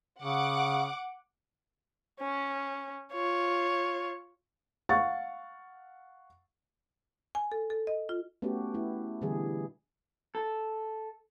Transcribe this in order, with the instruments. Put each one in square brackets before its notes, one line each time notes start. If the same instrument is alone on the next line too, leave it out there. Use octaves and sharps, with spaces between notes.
[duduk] C#3 [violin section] F#5 D6
[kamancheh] C#4
F4 C#5
[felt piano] F5 F#5 C#6 A6
[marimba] G#5
A4
A4
D#5
F4
[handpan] A3 B3 C#4 F#4 G4
A3 E4
B2 D3 E3 G3 G#4
[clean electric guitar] A4